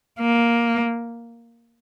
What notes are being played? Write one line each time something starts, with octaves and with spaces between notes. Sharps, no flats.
A#3